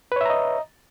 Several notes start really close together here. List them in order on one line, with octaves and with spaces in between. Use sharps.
B4 C#5 E5 A#5 D#5